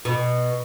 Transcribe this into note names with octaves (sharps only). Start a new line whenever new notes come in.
B2